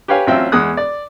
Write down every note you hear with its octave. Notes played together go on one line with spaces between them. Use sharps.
G4 B4 C#5 F5 G#5
A1 F#3 C4 F4 E5 G5
E2 G#3 D#6 F#6
D5